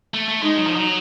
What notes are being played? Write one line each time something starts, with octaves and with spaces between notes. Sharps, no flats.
A3
A3
G#3 D#4
F#3
F3
F#3